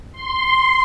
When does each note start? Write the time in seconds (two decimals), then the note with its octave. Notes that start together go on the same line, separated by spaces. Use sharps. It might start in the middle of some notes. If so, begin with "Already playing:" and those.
0.12 C6